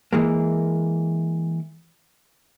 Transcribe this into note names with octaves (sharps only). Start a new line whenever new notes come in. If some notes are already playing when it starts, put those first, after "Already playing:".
E3 G#3 A#3